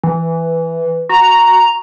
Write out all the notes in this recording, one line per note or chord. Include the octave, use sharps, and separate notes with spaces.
E3
F#4 A#5